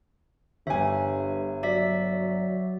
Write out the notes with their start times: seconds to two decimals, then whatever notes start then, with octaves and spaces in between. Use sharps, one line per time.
0.67 G1 G2 E5 G#5
1.63 F#3 D5 E5 B6